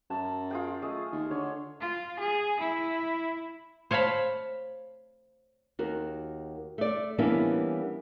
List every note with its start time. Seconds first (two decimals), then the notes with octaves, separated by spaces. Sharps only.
0.10 F#2 A5
0.51 F4 G#4 G5
0.82 A3 G#4 D#5
1.12 D#2
1.31 D3 C#5
1.80 F4
2.19 G#4
2.60 E4
3.91 C5 C#5 F5 A5 B5
5.79 D#2 F#4 A#4
6.78 A3 D5
7.18 E3 G3 A#3 B3 C#4 D4